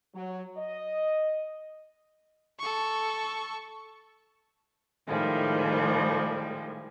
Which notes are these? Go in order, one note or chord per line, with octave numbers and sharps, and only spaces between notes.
F#3
D#5
A4 C#6
A2 D#3 F3 G3 G#3